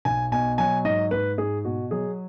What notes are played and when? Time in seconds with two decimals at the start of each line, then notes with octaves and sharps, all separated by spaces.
0.05 B1 G#5
0.32 B2 G#5
0.58 F#3 G#5
0.84 G#2 D#5
1.11 G#2 B4
1.38 G#2 G#4
1.65 B2 F#4
1.91 F#3 G#4